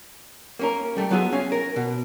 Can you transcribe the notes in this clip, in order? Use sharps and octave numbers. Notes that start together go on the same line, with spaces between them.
A#3 C#4 A#4
G3 A3
F#3 B3 F4 G#4 E5
C#4 F5 G#5
A#4
B2